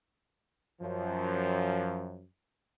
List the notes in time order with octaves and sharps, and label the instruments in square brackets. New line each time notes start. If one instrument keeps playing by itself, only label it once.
[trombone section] F#2 F3